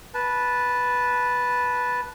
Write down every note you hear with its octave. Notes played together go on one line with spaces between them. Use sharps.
B4 A5